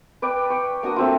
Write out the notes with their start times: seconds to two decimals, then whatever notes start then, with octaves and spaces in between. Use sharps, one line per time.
0.22 B4 D5 G5
0.50 G5 C#6
0.83 A#3 D4 F#4 D#6
0.96 A3 C4 F4